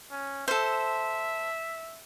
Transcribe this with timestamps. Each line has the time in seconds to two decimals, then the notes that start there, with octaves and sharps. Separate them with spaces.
0.11 C#4
0.48 A4 C5 E5